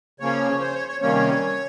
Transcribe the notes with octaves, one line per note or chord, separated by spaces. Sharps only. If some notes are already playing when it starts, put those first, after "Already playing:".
C#3 F3 A#3 C#4 C#5
C5
C#5
C#5
C3 D#3 G3 A#3 C#4 C#5